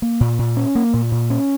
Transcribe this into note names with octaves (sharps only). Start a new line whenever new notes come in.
A#3
A#2
A#2
C#4
A#3
A#2
A#2
C#4